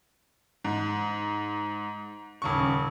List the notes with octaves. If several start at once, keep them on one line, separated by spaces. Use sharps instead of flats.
G#2
D#1 C#3 C#6